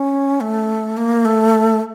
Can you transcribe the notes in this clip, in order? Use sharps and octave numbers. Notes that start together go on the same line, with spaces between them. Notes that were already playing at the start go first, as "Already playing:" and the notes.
Already playing: C#4
A3
A#3
A3